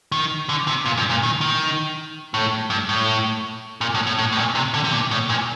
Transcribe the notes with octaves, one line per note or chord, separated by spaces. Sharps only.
D#3
D3
C3
A#2
G2
A#2
D#3
D#3
A2
G2
A2
A#2
A2
A2
A2
A2
A#2
C3
D3
C3
A#2
A2
A#2